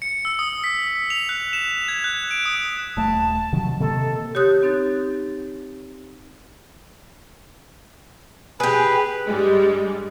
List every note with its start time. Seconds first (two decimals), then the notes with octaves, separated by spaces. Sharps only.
0.02 C#7
0.25 E6
0.39 D#6
0.64 B6
1.10 F7
1.29 F#6
1.53 E7
1.88 G#6
2.04 F#6
2.31 D7
2.46 D#6
2.97 D#1 A3 A5
3.53 C3 D#3 F#3
3.80 C3 D#3 A#3 A4
4.35 G4 C#5 C6 D#6 F#6 G6
4.63 C4 D#4 A6
8.60 G4 G#4 B4
9.28 G2 G3 G#3